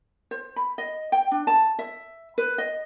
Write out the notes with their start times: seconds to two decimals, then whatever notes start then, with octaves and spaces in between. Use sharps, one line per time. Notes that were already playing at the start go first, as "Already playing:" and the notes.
0.31 C5
0.56 B5
0.78 D#5
1.12 G5
1.31 D4
1.47 A5
1.79 E5
2.38 B4
2.58 D#5